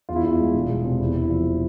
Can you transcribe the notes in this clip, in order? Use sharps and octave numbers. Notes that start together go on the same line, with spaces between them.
E2 F4
E4
E2 F4
G#3
E1
G#3
C3
E2 E4
E2
E4
F3